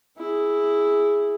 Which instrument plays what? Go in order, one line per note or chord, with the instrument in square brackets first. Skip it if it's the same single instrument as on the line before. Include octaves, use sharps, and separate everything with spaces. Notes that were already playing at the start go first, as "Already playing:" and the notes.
[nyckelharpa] E4 G#4